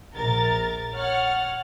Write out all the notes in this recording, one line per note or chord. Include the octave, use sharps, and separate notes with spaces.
A#1 A#4 A6
C#5 F#5 F6 A6